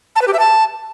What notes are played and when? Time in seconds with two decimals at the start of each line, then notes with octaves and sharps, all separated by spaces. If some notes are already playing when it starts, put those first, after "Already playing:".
0.16 A5
0.21 B4
0.27 G4
0.33 E5
0.39 A5